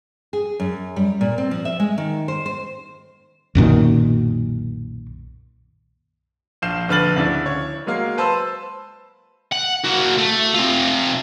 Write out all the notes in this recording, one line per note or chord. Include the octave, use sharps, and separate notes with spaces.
G#4
F#2
G3
A#2
C4
F3
E5
G#3
D#3
C5
C5
B1 F#2 A#2 D#3
A#1 F5 G6 C7 E7
A#1 D3 B4 F6 A6 F#7
D2 C#3 D4 E4
C#5
F#3 G#3 A#3 F5
B4 C5 A5 E6
F#5
A#3 F#4
A3
C3 F4